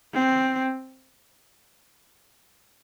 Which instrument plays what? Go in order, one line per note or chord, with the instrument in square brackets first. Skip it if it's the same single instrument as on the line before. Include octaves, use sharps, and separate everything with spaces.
[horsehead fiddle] C4